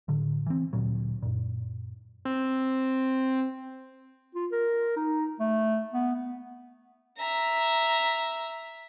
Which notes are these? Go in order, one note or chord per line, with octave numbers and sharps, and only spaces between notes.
A2 D3
E3 C4
D2 A#2 F#3
F#2 A#2
C4
F4
A#4
D#4
A3
B3
E5 A#5